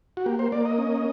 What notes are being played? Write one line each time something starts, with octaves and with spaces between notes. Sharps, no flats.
F#4
A#3 G4
C5
A#3 D5
D#5
C#4